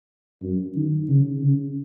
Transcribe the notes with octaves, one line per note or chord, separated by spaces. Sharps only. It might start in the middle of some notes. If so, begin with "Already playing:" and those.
F#2
D#3
C#3
C#3